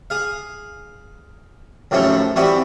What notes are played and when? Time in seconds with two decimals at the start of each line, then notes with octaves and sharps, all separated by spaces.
0.10 G#4 F5
1.91 D#2 A2 F3 F#3 A3 C#4
2.36 E3 G3 B3 C4 F#4